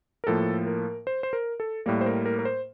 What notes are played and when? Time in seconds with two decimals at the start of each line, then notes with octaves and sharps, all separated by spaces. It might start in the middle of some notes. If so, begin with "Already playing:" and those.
0.24 A#4
0.27 A2 F3 A#3 A4
0.67 A#4
1.07 C5
1.23 C5
1.33 A#4
1.60 A4
1.86 A2 G3 A#3 A#4
2.01 C5
2.06 A#4
2.26 A#4
2.39 A#4
2.45 C5